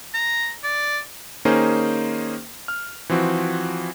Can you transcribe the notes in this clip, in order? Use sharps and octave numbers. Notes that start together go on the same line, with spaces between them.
A#5
D5
D#3 A#3 C#4 D#4 G#4 C5
F6
E3 F3 C4 F#4